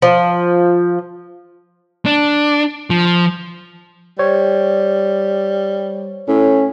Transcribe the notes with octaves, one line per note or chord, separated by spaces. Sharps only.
F3
D4
F3
G3 C5 C#5
A2 C#4